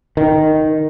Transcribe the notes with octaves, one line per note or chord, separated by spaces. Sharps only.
D#3